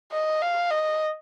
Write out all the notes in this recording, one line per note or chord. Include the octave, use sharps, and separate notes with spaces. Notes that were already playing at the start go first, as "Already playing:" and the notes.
D#5
F5
D#5